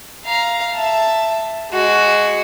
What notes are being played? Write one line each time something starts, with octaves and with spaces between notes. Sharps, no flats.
F5 A#5
E5 A5
G#3 F#4